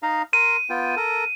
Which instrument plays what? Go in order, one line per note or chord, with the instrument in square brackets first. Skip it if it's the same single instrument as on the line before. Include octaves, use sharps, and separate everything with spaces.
[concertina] D#4 D#5 F5
[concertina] A#4 C6 [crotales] D#7
[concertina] B3 F4 G5
A4 A#4